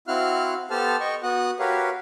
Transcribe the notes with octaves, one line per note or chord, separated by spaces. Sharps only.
C4 E4 F#4 F5 F6 F#6
B3 G4 A4 C5 A5 F6
D#5 G5 C#6
B3 F#4 D#6 F#6
F#4 G4 A#4 B4 C#5 F5